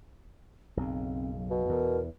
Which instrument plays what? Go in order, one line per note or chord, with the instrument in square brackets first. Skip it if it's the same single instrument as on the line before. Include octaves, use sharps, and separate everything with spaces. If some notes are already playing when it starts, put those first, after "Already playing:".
[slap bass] B1 F#2 C#3 [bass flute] C4
[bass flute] F#3
[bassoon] B2
[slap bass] E2 E3 [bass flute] A#4